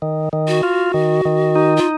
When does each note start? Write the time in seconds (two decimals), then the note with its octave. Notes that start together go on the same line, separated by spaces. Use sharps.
0.02 D#3
0.33 D#3
0.48 F#4
0.63 F4
0.94 D#3
1.25 D#3
1.56 D#4
1.76 F4